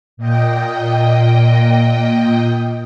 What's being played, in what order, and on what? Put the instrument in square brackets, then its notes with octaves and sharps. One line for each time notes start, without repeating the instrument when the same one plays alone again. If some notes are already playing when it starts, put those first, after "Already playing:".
[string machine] A#2 D#5 G5